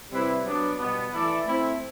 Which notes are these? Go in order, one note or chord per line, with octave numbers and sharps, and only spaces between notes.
C3 G3 C4 E4 B4
F#3 B3 D4
B2 G3 B3
E3 A3 E4 A4 D5
A3 C4 E4